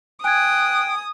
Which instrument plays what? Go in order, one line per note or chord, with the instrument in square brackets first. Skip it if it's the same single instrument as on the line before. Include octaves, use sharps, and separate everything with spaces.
[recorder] G5 [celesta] G#5 G#6 [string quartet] D#6 [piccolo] F#6